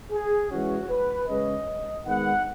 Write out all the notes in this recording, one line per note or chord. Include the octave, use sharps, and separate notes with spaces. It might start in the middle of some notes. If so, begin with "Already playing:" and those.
G#4
E3 G#3 C#4 F#4
B4
C#3 G#3 C#4 D#5
D#3 G#3 B3 F#5